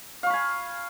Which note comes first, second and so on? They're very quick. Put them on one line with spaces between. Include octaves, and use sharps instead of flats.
F5 C#6 B5 G#5